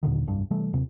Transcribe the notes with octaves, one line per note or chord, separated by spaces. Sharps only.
D#2 A#2 D3 D#3
F1 C2 G2 D4
C3 E3 G3 A3
D#2 C3